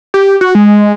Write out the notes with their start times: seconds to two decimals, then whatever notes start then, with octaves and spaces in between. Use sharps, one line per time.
0.14 G4
0.41 F#4
0.55 G#3